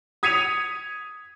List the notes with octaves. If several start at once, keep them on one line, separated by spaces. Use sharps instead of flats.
D#6 G#6 B6 C#7 D#7 F7